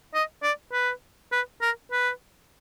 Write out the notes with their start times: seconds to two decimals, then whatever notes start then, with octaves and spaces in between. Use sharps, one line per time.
0.14 D#5
0.43 D5
0.73 B4
1.32 B4
1.62 A#4
1.92 B4